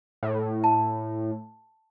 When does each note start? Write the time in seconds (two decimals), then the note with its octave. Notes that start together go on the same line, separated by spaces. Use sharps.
0.23 A2
0.64 A5